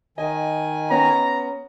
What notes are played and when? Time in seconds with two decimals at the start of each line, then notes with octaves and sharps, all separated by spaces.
0.18 D#3 D#5 G#5
0.90 B3 C#4 A#5